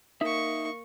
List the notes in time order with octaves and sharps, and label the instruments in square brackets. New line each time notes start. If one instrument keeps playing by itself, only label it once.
[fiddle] A#3 C#6 [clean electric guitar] D#4 E5